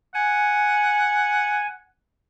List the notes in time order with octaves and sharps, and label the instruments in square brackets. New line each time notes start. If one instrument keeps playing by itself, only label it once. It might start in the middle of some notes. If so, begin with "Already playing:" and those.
[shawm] F#5 [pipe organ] G#5